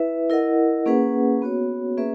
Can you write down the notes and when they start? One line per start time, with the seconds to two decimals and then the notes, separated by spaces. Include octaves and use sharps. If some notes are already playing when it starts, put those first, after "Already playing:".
Already playing: E4 B4 E5
0.30 E4 A#4 D#5 F#5
0.86 A#3 C#4 G#4 B4 F#5
1.42 B3 F#4 C#5
1.97 A#3 C#4 G#4 B4 E5